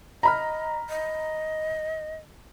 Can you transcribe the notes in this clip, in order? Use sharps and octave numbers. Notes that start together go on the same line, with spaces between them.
D#5 A#5 B5 F6
D#5